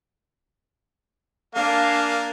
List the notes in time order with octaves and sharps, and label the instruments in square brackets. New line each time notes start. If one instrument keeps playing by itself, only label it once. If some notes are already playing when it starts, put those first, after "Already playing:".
[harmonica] A#3 [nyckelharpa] D4 G#5 [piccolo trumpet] F5